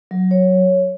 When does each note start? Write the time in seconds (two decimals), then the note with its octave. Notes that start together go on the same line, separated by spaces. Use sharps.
0.11 F#3
0.31 C#5